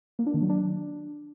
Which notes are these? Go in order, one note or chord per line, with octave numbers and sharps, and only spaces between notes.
A#3
D4
D#3
F#3
D4